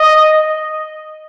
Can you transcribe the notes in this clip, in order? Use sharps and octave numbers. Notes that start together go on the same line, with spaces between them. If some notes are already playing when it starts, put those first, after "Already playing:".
Already playing: D#5